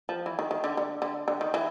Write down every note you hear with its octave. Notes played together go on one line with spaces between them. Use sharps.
F3
E3
D#3
D#3
D3
D3
D3
D3
D#3
E3